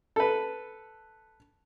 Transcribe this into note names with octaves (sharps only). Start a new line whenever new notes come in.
A4 B4